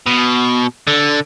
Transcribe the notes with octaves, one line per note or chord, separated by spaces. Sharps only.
B2
D3